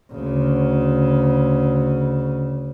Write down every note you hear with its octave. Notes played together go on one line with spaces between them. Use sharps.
D2 C#3